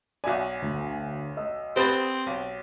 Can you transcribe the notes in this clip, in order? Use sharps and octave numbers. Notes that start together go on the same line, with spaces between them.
B1 F#4 D5 E5 G#5
D2
D#5 E6
C4 G4 B4 C5 D#6 A6
B1